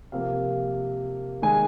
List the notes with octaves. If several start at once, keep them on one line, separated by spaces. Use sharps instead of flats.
C3 F3 A#3 F5
D#3 G#3 G#5